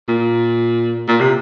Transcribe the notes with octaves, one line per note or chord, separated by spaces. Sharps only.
A#2
A#2
C3